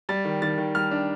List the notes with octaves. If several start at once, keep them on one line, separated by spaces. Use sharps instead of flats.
G3 A6
D#3
D#3 A6
D#3
G3 F6
D4